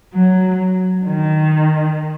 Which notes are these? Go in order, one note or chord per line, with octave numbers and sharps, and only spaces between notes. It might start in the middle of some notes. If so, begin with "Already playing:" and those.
F#3
D#3